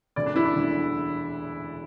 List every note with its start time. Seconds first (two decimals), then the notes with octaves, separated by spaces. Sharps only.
0.16 E1 D2 D3 D5
0.26 D4
0.36 E4
0.45 D4
0.55 E1 D2 D3